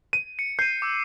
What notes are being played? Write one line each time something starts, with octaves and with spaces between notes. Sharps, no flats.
D#7
C#7
G6 C7 D#7
D6 E6